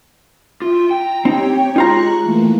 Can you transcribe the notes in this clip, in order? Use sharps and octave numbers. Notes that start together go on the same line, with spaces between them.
F4 E5 G5
G5 A#5
C4 D#4 G4 C#5
G#3 D#4 F4 A#5 C#6 F#6
E3 A3 A#3